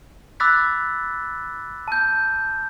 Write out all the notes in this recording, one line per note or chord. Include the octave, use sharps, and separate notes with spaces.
B5 D6 E6 F#6 A6 B6
A5 G6